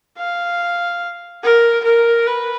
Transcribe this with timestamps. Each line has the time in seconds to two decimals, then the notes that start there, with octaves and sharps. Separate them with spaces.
0.18 F5
1.43 A#4
1.84 A#4
2.26 B4